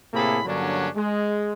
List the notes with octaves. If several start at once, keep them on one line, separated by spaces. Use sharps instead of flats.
A2 C3 A#3 G#4 A4 B5
G2 D3 F#3 A#3 C#4 D4
G#3